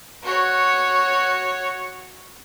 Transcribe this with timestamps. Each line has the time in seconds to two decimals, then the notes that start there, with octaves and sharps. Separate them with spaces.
0.23 F#4 C#5